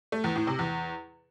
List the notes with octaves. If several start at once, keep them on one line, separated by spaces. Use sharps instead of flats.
A3
E2
A2
C3
E2